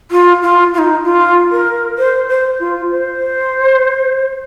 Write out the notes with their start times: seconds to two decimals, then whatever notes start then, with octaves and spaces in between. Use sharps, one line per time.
0.11 F4
0.42 F4
0.74 F4
0.78 D#4
1.04 F4
1.52 A#4
1.98 C5
2.29 C5
2.60 F4
2.91 C5